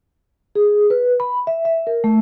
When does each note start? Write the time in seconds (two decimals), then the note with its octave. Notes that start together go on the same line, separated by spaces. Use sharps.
0.55 G#4
0.90 B4
1.20 B5
1.47 E5
1.65 E5
1.87 A#4
2.04 A3